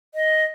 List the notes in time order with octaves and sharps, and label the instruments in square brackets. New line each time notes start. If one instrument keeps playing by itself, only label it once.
[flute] D#5